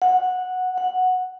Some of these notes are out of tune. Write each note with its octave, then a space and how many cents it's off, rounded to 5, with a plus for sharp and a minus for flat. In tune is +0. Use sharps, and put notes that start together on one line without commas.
F#5 -10
F#5 -5